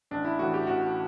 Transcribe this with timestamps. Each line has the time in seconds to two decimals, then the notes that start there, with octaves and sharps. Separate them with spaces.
0.11 A1 D4
0.25 E4
0.39 A2 E3 F#4
0.54 G4
0.67 A1 F#4